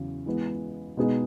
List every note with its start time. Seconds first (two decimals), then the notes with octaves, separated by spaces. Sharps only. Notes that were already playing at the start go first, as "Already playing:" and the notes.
Already playing: E2 C#3 F#3
0.26 E3 G#3 B3
0.97 B2 G#3 B3 D#4 G#4